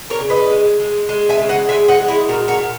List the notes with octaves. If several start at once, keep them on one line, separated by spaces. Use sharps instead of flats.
A#4 C#5
C#3
B4 D#5
G#3
G#3
G#3
E5 G#5
C#3
D#5 F#5
G#3 E5 G#5
D#5 F#5
G#3
E4 G#4
A#2 F#4 A#4
F#4 A#4
A#2